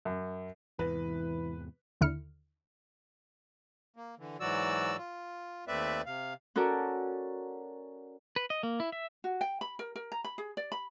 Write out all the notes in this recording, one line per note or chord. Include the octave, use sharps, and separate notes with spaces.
F#2
E2 G#2 C3 E3 B4
D#2 D3 E4 F6 C#7
A#3
D3 E3
G#2 E3 F#3 F#4 D5 E6
F4
D#2 A3 C4 B4 D5 E5
C3 F5
C#4 F#4 A4 A#4 D5
B4
D#5
A#3
E4
E5
F#4
G5
B5
A#4
A#4
A#5
B5
G#4
D5
B5